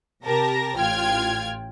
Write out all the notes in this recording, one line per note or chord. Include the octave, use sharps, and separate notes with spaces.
C3 G4 A#4 A5 A#6
A1 F4 G5 F6 G#6